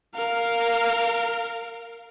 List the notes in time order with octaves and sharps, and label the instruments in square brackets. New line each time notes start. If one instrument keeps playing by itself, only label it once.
[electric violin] A#4 F5